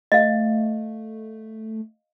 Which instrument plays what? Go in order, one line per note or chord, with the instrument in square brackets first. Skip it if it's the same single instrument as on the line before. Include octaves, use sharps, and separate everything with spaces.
[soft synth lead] A3 [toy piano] D#5 F5